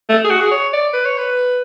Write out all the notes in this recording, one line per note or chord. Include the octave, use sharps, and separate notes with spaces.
A3
G#4
F#4
G#4
C#5
D5
B4
C#5
B4